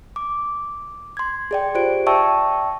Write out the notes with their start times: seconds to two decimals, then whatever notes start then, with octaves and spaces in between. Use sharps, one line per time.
0.16 D6
1.17 C6 G#6
1.51 G#4 D5 G5
1.75 F4 G4 C5 D5 D7
2.06 D5 E5 G5 A5 C#6 E6